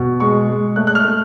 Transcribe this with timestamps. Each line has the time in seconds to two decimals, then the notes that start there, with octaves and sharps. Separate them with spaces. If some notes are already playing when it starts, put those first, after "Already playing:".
Already playing: B2
0.20 G#3 C#6
0.49 G#3
0.76 A3 F#6
0.87 F#6
0.95 F6
1.05 A3